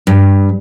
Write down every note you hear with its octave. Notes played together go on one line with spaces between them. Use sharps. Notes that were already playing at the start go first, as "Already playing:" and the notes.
G2